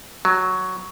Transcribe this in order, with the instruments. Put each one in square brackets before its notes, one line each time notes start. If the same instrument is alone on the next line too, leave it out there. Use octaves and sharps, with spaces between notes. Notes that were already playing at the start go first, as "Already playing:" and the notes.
[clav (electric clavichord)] F#3